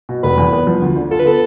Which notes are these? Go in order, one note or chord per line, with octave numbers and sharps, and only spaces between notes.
B2
F1 B4
E2
B3
F3
D2
D3
F4 A4
B4
B3 A4